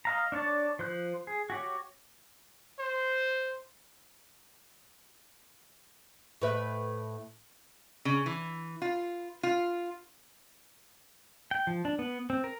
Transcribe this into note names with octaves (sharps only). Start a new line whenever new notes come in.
D#5 F5 A#5
D4 C#5 D5 A5
F3 C5 F#6
G#4
F#4 G4 C#5
C5
A2 B4 E5
C#3
E3
F4
F4
G5
F3
D4
B3
C4
A#4